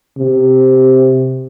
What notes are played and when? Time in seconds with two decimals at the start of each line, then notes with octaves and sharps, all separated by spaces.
0.18 C3